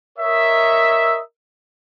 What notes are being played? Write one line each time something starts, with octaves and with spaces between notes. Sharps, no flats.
A#4 C#5 D#5 E5